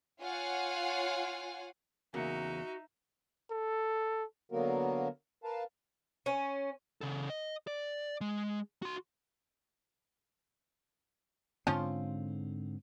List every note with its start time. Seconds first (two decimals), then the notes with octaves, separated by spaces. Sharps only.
0.22 F4 C#5 F5 F#5 G#5
2.14 E2 C#3 A#3 D#4 F#4 E5
3.51 A4
4.52 D3 F#3 A#3 B3 F#4 A#4
5.44 A#4 B4 F5 A5
6.26 C#4
7.01 C#3 A4
7.30 D#5
7.67 D5
8.21 G#3
8.82 F#4 C6
11.67 G#2 D3 F3 C4 C#4 F4